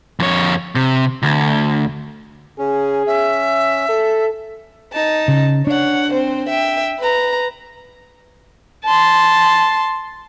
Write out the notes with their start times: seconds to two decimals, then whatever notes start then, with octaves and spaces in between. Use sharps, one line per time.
0.20 F2 C#5
0.75 C3
1.23 D2
2.59 C#3 C#4 G#4
3.07 C#4 E5
3.89 A4
4.94 D#4 A5
5.28 C#3
5.67 D4 C#5 F#5
6.12 C4 C5
6.49 E5 G5
6.99 B4 A#5
8.84 A5 C6